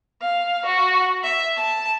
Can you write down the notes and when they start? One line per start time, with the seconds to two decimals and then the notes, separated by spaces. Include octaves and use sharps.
0.21 F5
0.65 F#4
1.23 E5
1.57 A5